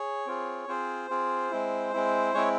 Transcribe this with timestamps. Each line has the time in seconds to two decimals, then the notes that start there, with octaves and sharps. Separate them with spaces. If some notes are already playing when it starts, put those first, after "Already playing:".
Already playing: G#4 C#5
0.26 C4 F4 G#4
0.68 C4 F4 G#4 C5
1.10 C4 F4 G#4
1.51 G#3 C4 E4
1.93 G#3 C4 E4
2.34 G#3 C4 E4 C#5